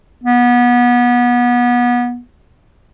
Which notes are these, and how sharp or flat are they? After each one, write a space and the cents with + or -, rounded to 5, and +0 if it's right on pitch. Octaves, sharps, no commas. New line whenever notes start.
B3 -25